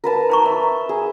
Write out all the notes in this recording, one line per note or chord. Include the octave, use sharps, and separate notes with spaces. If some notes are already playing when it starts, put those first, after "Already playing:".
A#4 B4 A5
C5 A#5 C#6
E5
G#4